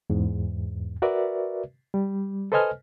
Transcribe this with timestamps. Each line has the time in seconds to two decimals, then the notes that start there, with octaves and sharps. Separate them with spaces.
0.10 E2 G#2
1.02 F#4 A#4 B4 D5 E5
1.94 G3
2.52 A4 B4 C5 D#5 G#5 F6